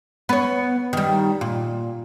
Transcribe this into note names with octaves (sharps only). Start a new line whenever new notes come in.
B3 C#5
D#3 G3
A#2